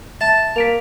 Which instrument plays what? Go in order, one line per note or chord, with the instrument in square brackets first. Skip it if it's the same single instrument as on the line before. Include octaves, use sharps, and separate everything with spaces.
[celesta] E5 [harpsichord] A5
[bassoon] A#3 [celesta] B6 D7 F7